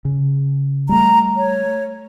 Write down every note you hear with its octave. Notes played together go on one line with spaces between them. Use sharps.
C#3
G3 A3 A#5
C#5